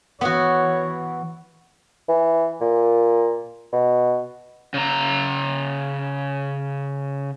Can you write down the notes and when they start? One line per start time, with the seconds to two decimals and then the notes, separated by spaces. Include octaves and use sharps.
0.21 E3 B3 F#4 C#5
2.09 E3
2.61 A#2
3.73 B2
4.74 C#3 A#5